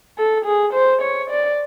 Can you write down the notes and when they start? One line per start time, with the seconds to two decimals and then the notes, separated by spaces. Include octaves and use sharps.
0.18 A4
0.45 G#4
0.74 C5
1.02 C#5
1.30 D5